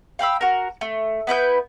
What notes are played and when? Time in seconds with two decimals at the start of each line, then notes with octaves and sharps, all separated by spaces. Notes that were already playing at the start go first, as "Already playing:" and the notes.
0.19 F5 G5 B5 E6
0.41 F#4 A#4
0.81 A3
1.27 B3 E4 B4 G6